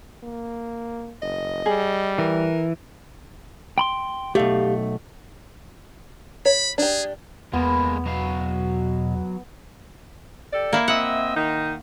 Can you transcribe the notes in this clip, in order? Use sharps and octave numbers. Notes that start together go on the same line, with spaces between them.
A#3
F#1 D#5
G3 G#4
E3 A#4
G5 B5 C6
B1 A3 G4 F5
C#5 B5
D4 G4 G#4
E2 G#3 A#3 B3
B2 F#3 F5
G4 A4 D5
A#3 E4
C4 D#5 E5 F#5
D#3 D#4